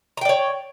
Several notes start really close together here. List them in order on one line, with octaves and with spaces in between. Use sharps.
A#5 G5 D5 C#5